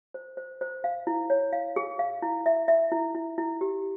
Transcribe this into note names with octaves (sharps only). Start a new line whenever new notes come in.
C5
C5
C5
F5
E4
C#5
F5
G#4
F5
E4
E5
E5
E4
E4
E4
G4